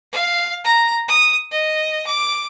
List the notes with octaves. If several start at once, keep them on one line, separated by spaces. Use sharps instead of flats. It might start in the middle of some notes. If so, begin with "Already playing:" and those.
F5
A#5
D#6
D#5
D6